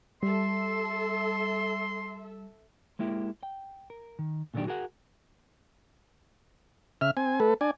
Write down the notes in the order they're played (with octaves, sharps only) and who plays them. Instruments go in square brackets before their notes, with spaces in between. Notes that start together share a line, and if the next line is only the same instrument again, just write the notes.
[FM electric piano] G3 [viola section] A4 E5 [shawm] C6
[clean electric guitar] G#3 A#3 E4 G4
G5
A#4
D#3
A#2 D3 D#3 F#3 D4 G4
F#4 G#4 A#4 F#5
[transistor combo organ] C#3 E5 F6
C4 G#5
A3 A4 B4
D4 D5 G#5